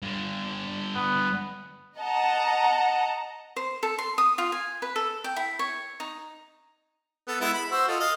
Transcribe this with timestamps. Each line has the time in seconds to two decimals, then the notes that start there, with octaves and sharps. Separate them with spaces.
0.02 G2 D3
0.95 B3
1.98 D#5 F#5 A5 A#5
3.56 C5
3.83 A4
3.98 C6
4.18 D#6
4.38 F4
4.52 G#5
4.82 B4
4.96 A4
5.24 G5
5.36 E4
5.59 C#5
6.00 D#4
7.28 B3 A4
7.41 G#3 B3 E4
7.53 B5
7.71 F#4 C5 E6
7.88 F4 A4 D#5
8.00 D#5 F5